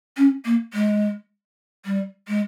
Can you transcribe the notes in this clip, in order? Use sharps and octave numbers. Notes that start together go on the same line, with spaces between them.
C#4
A#3
G#3
G3
G#3